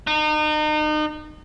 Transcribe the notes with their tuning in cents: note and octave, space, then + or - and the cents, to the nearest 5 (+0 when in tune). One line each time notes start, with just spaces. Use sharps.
D#4 -35